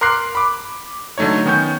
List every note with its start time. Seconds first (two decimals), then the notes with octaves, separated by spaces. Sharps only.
0.01 A#4 C6 D6 F#6 C7
0.35 B5 D6
1.18 D3 F#3 A3 D#4 C#5
1.46 D#3 B3 C#4 C#6 G6